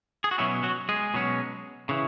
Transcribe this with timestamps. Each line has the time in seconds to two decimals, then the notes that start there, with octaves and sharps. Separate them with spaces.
0.24 G#4
0.31 F#4
0.38 B2 F#3 C#4 E4
0.63 F#3 F#4
0.89 G#3 G#4
1.14 B2 F#3 C#4
1.89 C#3 E3